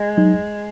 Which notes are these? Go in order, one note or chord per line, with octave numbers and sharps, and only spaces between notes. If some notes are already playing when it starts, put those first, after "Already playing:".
Already playing: G#3
F#3 D#4